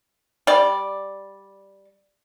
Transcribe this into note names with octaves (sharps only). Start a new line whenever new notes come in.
G3 D5